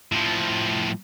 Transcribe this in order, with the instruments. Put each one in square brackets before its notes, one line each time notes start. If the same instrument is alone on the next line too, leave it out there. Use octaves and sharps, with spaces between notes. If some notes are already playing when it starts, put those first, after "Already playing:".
[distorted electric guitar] A2 F3